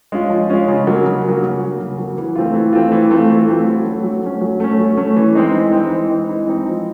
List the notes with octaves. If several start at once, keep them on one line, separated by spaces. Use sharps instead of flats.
G#3 C#4 F4
F3
G#3 C#4 F4
C#3
F#3 A#3
C#3
A#3
F#3
C#3
F#3 A#3
C#3
F#3 A#3
E3
A3 C4 F4
E3
A3 C4 F4
E3
A3 C4 F4
E3
A3 C4 F4
F#3
A3 C#4
F#3
A3 C#4
F#3
A3 C#4
F#3
A3 C#4
E3
G#3 C4 D#4
E3
G#3 C4 D#4
E3
G#3 C4 D#4
E3
G#3 C4 D#4
F3